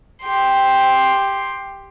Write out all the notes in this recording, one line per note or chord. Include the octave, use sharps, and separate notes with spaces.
G4 C6